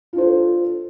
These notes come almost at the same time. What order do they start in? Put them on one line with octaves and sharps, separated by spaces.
F4 D4 C5 A4